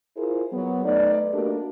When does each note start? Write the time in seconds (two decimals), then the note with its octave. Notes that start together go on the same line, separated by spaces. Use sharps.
0.17 E4 F4 G#4 A#4 C5
0.52 F#3 B3
0.85 A3 D#4 B4 D5
1.34 A3 A#3 D4 F#4 G4 A#4